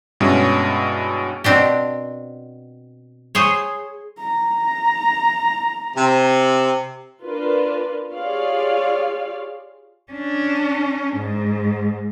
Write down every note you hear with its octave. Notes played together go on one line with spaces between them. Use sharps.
G2 B2 G#3 C#4 E4
B2 C4 D4 G4
G#4 C5 C#5
A#5
C3
D4 F4 A#4 B4
F4 G4 G#4 C#5 D5 F5
C#4 D4
G#2